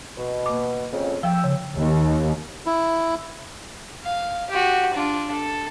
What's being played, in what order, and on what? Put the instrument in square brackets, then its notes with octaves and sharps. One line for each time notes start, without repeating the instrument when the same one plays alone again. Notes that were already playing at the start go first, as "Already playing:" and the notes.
[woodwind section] B2
[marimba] A#3 D6
[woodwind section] F2 C#3
[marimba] F3 [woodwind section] G5 E6
[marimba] C#3
[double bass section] D#2
[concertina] E4
[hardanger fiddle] F5
F#4 G4
D4 F4
A4